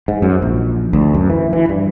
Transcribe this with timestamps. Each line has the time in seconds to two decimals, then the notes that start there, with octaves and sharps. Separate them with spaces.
0.08 G#2
0.22 F#2
0.42 A#1
0.93 D2
1.14 F#2
1.30 E3
1.53 E3
1.69 G2